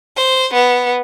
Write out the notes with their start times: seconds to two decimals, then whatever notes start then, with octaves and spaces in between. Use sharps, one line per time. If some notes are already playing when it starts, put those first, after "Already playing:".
0.17 C5
0.54 B3